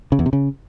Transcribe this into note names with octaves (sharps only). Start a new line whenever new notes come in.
C#3
E2
C3
C#3